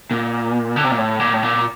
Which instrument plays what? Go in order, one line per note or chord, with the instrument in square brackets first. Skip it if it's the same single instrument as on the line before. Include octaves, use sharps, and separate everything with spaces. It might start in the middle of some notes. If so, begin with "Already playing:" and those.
[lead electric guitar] A#2
D3
C3
A#2
A2
A#2
A2
A#2